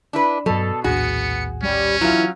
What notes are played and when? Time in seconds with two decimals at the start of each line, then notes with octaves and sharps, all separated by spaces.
0.13 D4 E4 B4
0.46 G2 B2 F#3 A4
0.84 A#1 D#2 A2 B3 F#4 G#4 C#7
1.63 G3 C#4
2.01 E3 F#3 F4